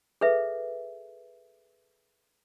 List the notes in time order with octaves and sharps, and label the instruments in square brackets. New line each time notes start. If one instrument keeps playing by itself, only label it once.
[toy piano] G#4 A4 B4 E5